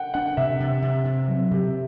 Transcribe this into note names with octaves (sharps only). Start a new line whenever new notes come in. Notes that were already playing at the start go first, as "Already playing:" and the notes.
Already playing: F#5 G5
D4 F#5
C3 E5
C3
C3
C3
F#3
C3 G4